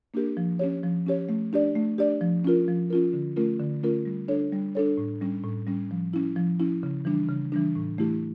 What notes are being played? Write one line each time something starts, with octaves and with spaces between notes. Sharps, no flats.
A#3 D4 G4 A#4
F3
C#4 G4 C#5
F3
C#4 G4 C#5
A3
D4 G4 D5
A3
D4 G4 D5
F3
C#4 F4 A#4
F3
C#4 F4 A#4
D3
A3 C#4 F4 A#4
D3
A3 C#4 F4 A#4
G3
D4 A4 C#5
G3
D4 A4 C#5
A2
G3 C#4
A2
G3 C#4
F3
C#4 E4
F3
C#4 E4
C#3
E3 G3 D4
C#3
E3 G3 D4
A2
E3 A3 E4 G4